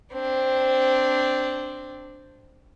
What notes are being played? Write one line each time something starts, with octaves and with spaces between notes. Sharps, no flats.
C4 D4